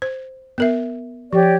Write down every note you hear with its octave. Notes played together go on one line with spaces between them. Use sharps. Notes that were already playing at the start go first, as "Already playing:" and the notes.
C5
B3 A#4 E5
F3 G4 C#5 D5